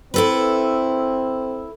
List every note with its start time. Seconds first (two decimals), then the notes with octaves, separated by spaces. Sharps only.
0.14 C4 E4 A4 B4